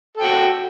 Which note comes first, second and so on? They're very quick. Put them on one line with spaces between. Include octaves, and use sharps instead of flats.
A4 G5 F#4